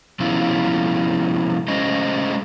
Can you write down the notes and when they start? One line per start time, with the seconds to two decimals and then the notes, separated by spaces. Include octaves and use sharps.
0.20 C3 F3 B3 C#4 E4 F4
1.68 G#3 A3 C#4 C5 D#5